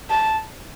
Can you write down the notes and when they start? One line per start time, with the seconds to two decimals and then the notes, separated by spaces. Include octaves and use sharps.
0.10 A5